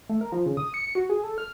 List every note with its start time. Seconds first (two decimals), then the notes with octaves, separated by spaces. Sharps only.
0.09 A3
0.21 A#4
0.32 F3
0.46 C#3
0.57 D#6
0.74 C#7
0.95 F#4
1.10 G#4
1.24 A4
1.38 F6